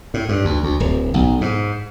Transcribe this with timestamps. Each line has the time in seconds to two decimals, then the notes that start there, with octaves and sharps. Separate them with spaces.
0.14 A2
0.29 G2
0.45 D2
0.63 D2
0.80 D1
1.14 B1
1.41 G#2